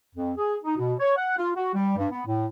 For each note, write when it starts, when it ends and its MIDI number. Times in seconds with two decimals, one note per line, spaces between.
0.15 0.31 41
0.37 0.55 68
0.64 0.76 63
0.77 0.93 47
0.99 1.14 73
1.17 1.36 78
1.37 1.50 65
1.56 1.69 66
1.74 1.93 55
1.97 2.06 43
2.11 2.22 59
2.26 2.45 45